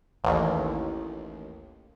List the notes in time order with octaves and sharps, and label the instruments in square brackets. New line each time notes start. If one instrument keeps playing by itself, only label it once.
[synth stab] A1 D#2